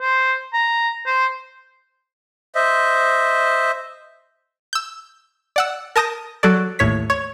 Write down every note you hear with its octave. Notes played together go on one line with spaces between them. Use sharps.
C5
A#5
C5
C5 D#5 E5
E6 G6
D5 F#5 E6
A#4 A5 D#6 G6 A#6
F#3 A4 D5
A1 D#2 A2 C#5 B6
C#5